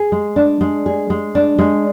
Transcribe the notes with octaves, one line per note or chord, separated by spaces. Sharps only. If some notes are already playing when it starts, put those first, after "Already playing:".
Already playing: G#4
G#3
D4
G#3
G#4
G#3
D4
G#3